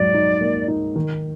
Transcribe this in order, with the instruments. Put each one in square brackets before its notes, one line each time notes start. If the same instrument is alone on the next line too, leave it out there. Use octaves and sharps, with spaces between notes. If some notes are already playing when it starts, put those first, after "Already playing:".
Already playing: [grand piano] G#2 F#3 [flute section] D5
[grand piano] D#4
A#3
D#4
D#3